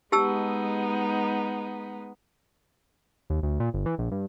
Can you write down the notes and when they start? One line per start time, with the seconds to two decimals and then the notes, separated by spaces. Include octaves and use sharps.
0.12 G#3 B3 D#4 G4 A5 E6
3.30 D#2
3.43 D2
3.60 A#2
3.74 G1
3.86 E3
3.98 A#1
4.12 G2